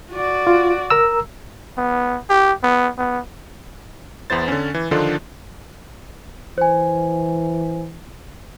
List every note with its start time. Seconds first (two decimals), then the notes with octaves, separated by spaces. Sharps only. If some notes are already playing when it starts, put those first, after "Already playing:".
0.11 F#4 D5
0.47 F4
0.90 A#4 A#5 E6
1.77 B3
2.30 G4
2.63 B3
2.98 B3
4.30 E2 B3 E4 C5 A6
4.48 D3 C#4
4.74 E3
4.91 D3 D#3 F3 D4 F4 A4
6.58 E3 C5 G#5